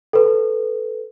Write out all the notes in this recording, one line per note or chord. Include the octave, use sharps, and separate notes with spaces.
A4 B4